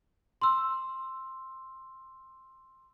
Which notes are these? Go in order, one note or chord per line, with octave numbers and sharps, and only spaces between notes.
C6 E6